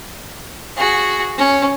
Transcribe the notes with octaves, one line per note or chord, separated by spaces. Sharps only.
F#4 G#4
C#4